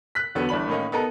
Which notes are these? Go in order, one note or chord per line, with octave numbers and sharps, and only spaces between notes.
F#6 B6
E2 D3 F#3 B3
G1 E3 D4 B5 F#7
A2 D#3 A#3 C#4 D#4
B3 D#4 A4 A#4